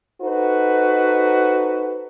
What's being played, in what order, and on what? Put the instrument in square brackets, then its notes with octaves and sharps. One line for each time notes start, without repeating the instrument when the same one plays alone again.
[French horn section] D#4 F#4 A4 B4 C5